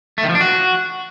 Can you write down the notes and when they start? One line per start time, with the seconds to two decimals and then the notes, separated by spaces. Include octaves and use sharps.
0.18 A3
0.24 D#3
0.29 F3
0.35 D4
0.41 F#4